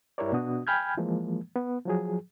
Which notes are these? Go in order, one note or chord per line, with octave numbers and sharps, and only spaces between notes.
G2 E4 G4 A#4 C#5 D5
B2 B3 D4 F#4 D#6
G5 G#5 B5 F6 G6 G#6
E3 F3 G#3 A#3
B3
F3 F#3 G#4